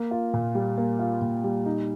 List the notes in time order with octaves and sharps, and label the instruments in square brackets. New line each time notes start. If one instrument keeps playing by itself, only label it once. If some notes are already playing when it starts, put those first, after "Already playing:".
Already playing: [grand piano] A#3
F4
A#2
G3
A#3
F4
A#2
G3
D#4